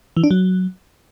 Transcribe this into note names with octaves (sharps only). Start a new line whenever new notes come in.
E3
D4
F#3